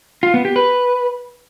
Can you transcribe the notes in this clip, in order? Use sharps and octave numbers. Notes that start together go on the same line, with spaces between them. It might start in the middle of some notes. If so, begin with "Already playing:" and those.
F4
B3
G4
B4